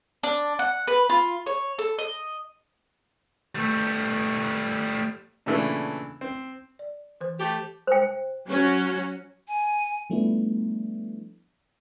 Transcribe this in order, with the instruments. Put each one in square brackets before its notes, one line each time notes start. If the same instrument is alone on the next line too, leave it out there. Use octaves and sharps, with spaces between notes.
[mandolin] D4
F#5
B4
F4
C#5
A4
D#5
[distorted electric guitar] G3 A3
[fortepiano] A#2 C#3 E3 A3 D4
C4
[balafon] D5
E3 C5
[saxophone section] A3 G4
[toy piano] C5 G5
[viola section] F#3 C#4 F#4
[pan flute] G#5
[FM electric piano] F3 G3 A3 B3 D4 E4